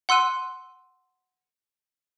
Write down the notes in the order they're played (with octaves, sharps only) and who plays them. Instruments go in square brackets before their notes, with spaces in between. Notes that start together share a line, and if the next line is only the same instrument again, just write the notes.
[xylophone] F#5 C6 E6 F#6 D#7